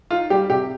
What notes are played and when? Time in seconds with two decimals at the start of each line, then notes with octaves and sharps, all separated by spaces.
0.11 D#4 F4
0.30 G3 G4
0.50 C3 G4